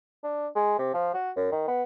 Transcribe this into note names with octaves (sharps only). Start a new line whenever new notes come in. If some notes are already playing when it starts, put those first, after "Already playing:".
D4
G#3
C3
F3
F#4
F#2
D#3
B3